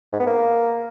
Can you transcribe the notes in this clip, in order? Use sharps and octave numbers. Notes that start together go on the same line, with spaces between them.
G#2
B3
A#3